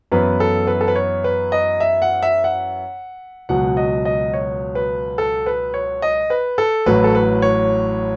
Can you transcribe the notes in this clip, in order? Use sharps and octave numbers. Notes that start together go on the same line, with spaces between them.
F#2 E3 B3 E4 B4
A4
B4
A4
B4
C#5
B4
D#5
E5
F#5
E5
F#5
C#2 B2 F#3 F#5
D#5
D#5
C#5
B4
A4
B4
C#5
D#5
B4
A4
A1 A2 F#3 B4
A4
B4
C#5